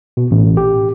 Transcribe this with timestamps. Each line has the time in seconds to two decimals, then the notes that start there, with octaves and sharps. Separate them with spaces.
0.17 B2
0.31 A1
0.57 G4